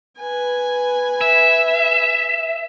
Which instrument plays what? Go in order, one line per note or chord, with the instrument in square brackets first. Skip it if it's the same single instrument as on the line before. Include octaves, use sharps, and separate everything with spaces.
[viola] B4 G#5
[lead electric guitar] E5